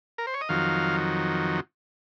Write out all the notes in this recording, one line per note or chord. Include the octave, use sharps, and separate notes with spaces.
A#4
C5
C#5
D#5
F2 D#3 F#3 F5